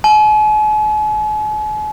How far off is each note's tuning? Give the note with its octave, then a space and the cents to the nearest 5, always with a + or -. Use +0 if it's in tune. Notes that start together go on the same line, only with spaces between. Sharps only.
G#5 +45